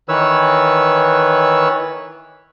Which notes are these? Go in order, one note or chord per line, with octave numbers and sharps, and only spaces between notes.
D#3 E3 B4 C#5 E6